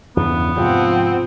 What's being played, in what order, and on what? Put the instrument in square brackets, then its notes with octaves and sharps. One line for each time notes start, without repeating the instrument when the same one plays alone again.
[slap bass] E2 G2 C#3 [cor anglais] B3
[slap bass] G#2 C3 [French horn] F3 [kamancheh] C4 F#5